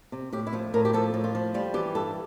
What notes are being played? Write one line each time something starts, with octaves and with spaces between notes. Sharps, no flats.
C3
A2 G4
E4
F3 F4
A2 A#4
G4
F3 A4
A2
F4
F3
G3 F4
E3 G4
G2 A4